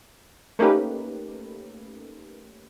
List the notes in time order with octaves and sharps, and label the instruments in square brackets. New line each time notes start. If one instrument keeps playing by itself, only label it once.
[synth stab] A3 A#3 C#4 D#4 G4 B4